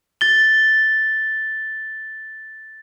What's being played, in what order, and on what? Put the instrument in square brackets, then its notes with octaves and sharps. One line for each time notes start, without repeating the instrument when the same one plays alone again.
[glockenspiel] A6 G7